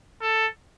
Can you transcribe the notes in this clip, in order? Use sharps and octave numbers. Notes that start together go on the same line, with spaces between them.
A4